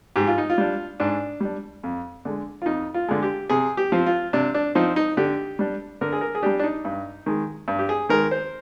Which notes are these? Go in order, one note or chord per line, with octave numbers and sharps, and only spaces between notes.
G#2 G4
F4
D#4
F4
G3 D4
G#2 D4
G3 D4
F2
D3 G#3
F4
F2 D#4
F4
D3 G#3
G4
C3 G#4
G4
F3 C4
F4
C3 D4
D4
F3 C4 D#4
D#4
D3 G4
G3 D4
D3 A#4
G#4
A#4
G#4
G3 D4 G4
D4
D#4
G2
D#3 G#3
G2
G4
G#4
D#3 G#3 A#4
C5